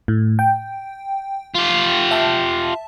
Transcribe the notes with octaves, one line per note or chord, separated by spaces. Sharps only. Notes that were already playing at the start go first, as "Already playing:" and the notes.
A2
G5
F4 G4
E5 A5